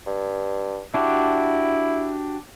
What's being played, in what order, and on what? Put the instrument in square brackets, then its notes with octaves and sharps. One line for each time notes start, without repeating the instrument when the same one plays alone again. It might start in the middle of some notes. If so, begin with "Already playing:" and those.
[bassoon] G2
[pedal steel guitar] D4 F#4 G4 [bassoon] E4